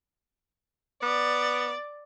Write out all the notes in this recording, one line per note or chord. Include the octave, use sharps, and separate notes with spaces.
B3 D5